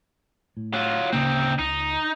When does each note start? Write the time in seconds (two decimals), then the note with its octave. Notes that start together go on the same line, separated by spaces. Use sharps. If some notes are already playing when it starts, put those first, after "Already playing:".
0.57 A2
0.74 F#3 F4
1.13 D1 C#3 A#3 C4 D#4
1.59 C#2 D#4